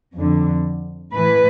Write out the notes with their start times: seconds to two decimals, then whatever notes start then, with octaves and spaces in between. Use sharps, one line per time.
0.15 F2 D3
1.13 A2 E3 B4